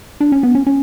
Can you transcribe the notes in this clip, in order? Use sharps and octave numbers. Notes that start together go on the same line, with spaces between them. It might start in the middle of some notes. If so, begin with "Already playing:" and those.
D4
C#4
B3
C#4
C#4